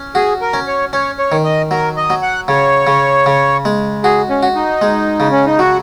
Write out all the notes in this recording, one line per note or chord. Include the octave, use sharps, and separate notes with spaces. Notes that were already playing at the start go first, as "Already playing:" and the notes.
Already playing: C#4
F#4 G#4
A#4
C#4
C#5
C#4 C#5
C#5
D#3
D#5
F#3 A#4
D#5
F#3
F#5
C#3 C#5
C#3
C#3
G#3
F#4 G#4
C#4
F#4
D#4
G#3
C#3
C#4
D#4
F#3 F#4